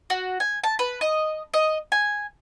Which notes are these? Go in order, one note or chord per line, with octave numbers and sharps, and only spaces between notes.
F#4
G#5
A5
B4
D#5
D#5
G#5